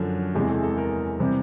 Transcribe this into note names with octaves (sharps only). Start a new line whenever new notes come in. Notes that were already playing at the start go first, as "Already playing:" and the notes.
Already playing: F#2 D3 F3
E2 C3 E3 G#3 G4
A4
A4
A#4
C3 E3 G3 C4